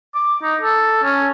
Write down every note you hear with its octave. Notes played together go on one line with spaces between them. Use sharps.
D6
D#4
A4
C#4